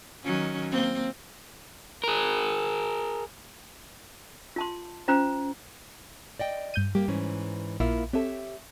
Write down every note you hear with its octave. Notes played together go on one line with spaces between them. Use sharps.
D#3 F#3 C#4
A#3 C4
G#4 A#4
F4 A5 C6
C#4 F4 C5 A#5
D5 D#5 G5
G2 G6 D#7
G3 A#3 G4
G#2 E3 C#4
A#1 A#3 E4 F4 E5
C4 G4 A4 C#5 E5